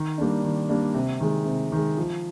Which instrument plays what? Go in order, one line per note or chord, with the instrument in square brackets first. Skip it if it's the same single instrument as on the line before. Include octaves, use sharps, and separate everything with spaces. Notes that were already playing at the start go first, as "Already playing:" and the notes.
Already playing: [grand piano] D#3
G3 A#3 D4
D#3
G3 A#3 D4
C3
D#3 G#3
C3
D#3 G#3
F3